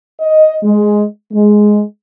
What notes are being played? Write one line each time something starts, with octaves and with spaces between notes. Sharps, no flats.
D#5
G#3
G#3